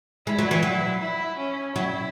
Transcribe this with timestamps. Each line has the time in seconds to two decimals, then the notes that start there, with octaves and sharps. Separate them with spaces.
0.26 G#3 E4
0.39 F#3
0.51 E3
0.63 F#3
1.01 E4
1.37 C#4
1.74 F#3 E4